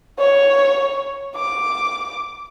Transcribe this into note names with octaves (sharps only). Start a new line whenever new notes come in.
C#5
D6